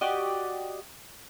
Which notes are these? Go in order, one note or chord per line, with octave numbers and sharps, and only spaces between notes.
F#4 G4 D5 D#5